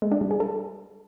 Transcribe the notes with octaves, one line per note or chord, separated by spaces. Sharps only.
G#3
D4
G3
G#4
A4